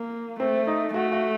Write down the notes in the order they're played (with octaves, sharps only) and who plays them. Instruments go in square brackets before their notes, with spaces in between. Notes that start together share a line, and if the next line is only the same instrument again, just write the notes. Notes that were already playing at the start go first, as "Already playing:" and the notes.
Already playing: [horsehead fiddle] A#3
[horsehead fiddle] A3 [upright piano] C4
[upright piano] D#4
[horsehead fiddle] A3 [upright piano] F#4
[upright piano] F#4